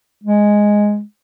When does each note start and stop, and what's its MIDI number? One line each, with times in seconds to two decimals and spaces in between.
0.24 1.02 56